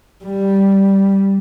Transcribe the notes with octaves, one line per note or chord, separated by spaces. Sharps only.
G3